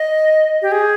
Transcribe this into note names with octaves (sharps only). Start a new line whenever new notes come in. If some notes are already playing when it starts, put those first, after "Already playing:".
Already playing: D#5
G4
G#4